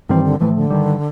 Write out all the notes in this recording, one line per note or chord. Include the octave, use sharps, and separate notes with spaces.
G2 D#3 E3 G3 C4
D3
A2 E3 F3 A3
D3
G2 D#3 G3